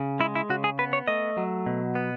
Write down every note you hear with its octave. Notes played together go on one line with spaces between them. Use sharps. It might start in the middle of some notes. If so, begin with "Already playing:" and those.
Already playing: C#3
G#3 E4
E4
C#3 F#4
G#4
B3 B4
C#5
A3 D#5
F#3
B2
B3